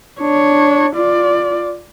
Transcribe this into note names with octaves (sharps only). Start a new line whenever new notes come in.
D4 C#5
F4 D5